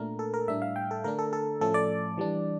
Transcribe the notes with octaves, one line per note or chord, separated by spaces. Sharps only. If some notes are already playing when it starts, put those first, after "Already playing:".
Already playing: A#2 A3 D4 A#4
A4
A#4
A2 G3 D4 E5
F5
G5
A4
D3 A3 D4 A#4
A4
A4
A2 F3 A3 C#4 A4
D5
E3 G3 D4